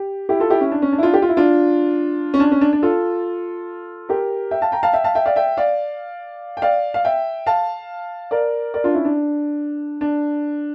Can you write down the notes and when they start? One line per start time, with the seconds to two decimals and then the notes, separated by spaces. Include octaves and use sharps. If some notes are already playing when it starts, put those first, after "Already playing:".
Already playing: G4
0.29 E4 G4
0.40 F4 A4
0.50 E4 G4
0.61 C#4 E4
0.71 D4
0.82 C#4
0.92 D4
0.98 E4
1.03 D4 F4
1.14 G4
1.22 F4
1.29 E4
1.37 D4 F4
2.34 C#4
2.40 D4
2.51 C#4
2.61 D4
2.73 D4
2.83 F4 A4
4.09 G4 A#4
4.51 E5 G5
4.62 F5 A5
4.72 G5 A#5
4.83 F5 A5
4.93 E5 G5
5.04 F5 A5
5.15 E5 G5
5.25 D5 F5
5.36 E5 G5
5.57 D5 F5
6.57 G5
6.62 D5 F5
6.94 F5
7.05 E5 G5
7.46 F5 A5
8.31 A#4 D5
8.74 A#4 D5
8.84 D4 F4
8.94 C#4 E4
9.05 D4
10.01 D4